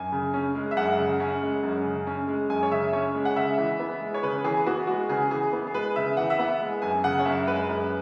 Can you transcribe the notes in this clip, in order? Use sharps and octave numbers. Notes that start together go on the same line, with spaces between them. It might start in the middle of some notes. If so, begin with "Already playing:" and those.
Already playing: F#2 G#5
C#3
C#4
G#3
E5
F#2 F#5
C#3
C#4
G#3
F#2
C#3
C#4
G#3
F#2 G#5
C#5
C#3 E5
C#4 C#5
G#3
F#5
C#3 E5
E3
B3
G#3
C#5
C#3 B4
E3 G#4
B3 F#4
G#3 F#4
C#3 G#4
E3 G#4
B3
G#4
G#3 B4
C#3 E5
E3 F#5
E5
B3 F#5
G#3
F#2 G#5
C#3 F#5
C#5
F#2 E5
G#3 B4
F#2